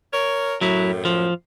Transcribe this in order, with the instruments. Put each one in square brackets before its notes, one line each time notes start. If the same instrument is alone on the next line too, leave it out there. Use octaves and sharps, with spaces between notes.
[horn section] A#4 C#5
[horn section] F#2 A2 [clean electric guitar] F#3 E4
[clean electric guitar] F3